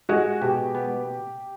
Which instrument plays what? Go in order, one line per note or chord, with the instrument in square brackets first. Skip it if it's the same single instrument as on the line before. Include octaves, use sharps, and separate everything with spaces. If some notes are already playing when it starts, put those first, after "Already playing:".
[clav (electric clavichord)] G#3 [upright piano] F#4
[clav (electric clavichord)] B2 [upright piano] G4
[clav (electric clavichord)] B3